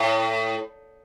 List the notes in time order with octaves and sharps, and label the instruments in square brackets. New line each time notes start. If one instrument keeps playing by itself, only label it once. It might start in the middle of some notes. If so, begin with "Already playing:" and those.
Already playing: [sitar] A2